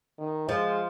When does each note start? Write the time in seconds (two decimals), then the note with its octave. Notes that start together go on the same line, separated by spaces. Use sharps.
0.19 D#3
0.49 F3 G#3